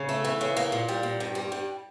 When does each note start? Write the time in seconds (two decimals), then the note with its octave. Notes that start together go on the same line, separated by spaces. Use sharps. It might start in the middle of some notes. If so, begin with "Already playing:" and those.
Already playing: C#3
0.09 A3
0.25 E3
0.41 C#3
0.57 A#3
0.72 A#2
0.88 G3
1.03 A#2
1.20 G2
1.35 G3
1.52 G2